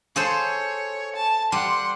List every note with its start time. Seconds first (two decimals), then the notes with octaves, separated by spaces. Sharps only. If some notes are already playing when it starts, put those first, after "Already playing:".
0.16 G#4 A4 C5 C#5
1.15 A5
1.52 G3 F#5 C6